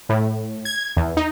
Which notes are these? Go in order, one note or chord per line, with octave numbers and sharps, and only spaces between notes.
A2
G#6
E2
D#4